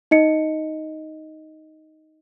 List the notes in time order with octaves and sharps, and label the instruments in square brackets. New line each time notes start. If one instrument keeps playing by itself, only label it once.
[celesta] D#4 D#5 C#7